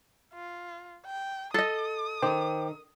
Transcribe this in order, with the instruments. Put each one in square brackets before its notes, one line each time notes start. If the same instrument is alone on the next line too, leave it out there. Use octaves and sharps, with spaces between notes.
[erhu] F4
G5
[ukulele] A4 D#5 [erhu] D#6
[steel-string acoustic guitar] D#3 [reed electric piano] C5 G5 D6